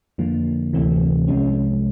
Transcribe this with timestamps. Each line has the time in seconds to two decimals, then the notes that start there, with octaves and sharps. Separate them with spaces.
0.18 F2 D3 F3 A#3
0.73 D2 C3 E3 A3 C4
1.28 C2 C3 F3 G#3 C#4